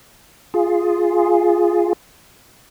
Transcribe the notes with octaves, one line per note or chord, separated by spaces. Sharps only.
F4 G#4